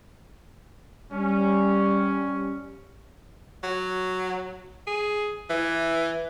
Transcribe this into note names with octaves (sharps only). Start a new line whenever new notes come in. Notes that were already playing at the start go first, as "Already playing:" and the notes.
G3 C#4
F#3
G#4
E3